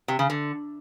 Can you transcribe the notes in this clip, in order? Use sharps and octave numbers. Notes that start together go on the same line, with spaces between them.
C3
C#3
D3